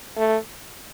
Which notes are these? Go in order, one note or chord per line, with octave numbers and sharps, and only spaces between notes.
A3